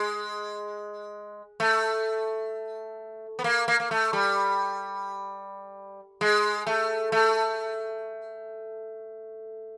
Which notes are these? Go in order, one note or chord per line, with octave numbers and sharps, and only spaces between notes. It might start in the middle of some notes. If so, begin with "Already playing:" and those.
Already playing: G#3
A3
B3
A#3
A#3
A#3
A3
G3
G#3
A3
A3